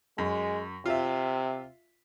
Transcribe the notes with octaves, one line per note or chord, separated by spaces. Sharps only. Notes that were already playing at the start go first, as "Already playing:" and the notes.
F#2 G#3
C3 F4 E5